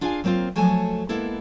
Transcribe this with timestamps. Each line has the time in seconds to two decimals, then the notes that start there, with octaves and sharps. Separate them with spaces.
0.01 D4 F4 G#4 F5 F#5 G#5
0.24 F#3 A#3 C4 D#4 F4
0.56 F3 F#3 A3 A4 C#5 G#5
1.09 G#3 A#3 B3 E4 A4